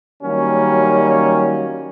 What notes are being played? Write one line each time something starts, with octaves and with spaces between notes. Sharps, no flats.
D#3 F#3 G3 A#3 C#4